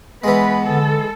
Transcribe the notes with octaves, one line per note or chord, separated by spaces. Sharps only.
E3 G#3 B3 B4
D3 A4